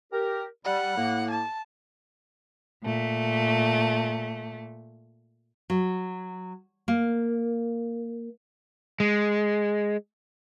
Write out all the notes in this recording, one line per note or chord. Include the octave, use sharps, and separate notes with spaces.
G4 A#4
G3 F#5
A2 A#3
A5
A#2 A3
F#3
A#3
G#3